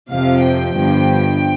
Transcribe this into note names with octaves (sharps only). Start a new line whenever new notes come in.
F2 C3 F3 F5
G5
G1 G2 F3